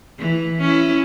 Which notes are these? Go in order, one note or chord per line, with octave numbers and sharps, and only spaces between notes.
E3
C#4 E4